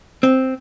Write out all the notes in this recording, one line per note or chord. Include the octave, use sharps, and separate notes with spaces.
C4